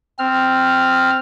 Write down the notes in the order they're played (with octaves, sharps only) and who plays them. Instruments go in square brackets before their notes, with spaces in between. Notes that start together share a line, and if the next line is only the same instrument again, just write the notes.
[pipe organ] C4 F6